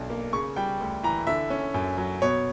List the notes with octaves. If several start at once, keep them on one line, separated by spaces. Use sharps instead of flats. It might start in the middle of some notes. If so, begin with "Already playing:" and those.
Already playing: B1 D4
A#3
C#3 C#6
G3 G5
D2
E3 A#5
D3 E5
C#4
F#2
F#3
B2 C#5